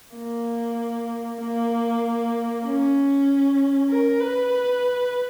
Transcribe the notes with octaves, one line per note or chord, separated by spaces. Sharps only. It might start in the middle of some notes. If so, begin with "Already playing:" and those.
A#3
A#3
C#4
A#4
B4